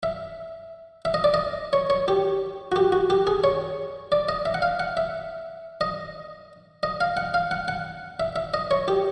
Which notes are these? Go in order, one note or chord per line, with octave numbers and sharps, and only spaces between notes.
E5
E5
D#5
D5
D#5
C#5
C#5
G4
F#4
G4
F#4
G4
G#4
C#5
D5
D#5
E5
F#5
F5
F#5
E5
D#5
D#5
F5
F#5
F5
F#5
F#5
E5
E5
D#5
C#5
G4